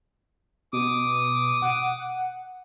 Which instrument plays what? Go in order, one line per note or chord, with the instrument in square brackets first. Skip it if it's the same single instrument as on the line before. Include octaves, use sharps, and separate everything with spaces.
[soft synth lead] B2 [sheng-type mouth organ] D6 D#6
[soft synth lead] F#5
F#5